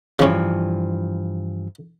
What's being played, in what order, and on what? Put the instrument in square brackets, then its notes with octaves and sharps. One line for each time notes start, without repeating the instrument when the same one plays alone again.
[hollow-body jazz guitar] G2 E3 F3 [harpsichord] C#3 C#4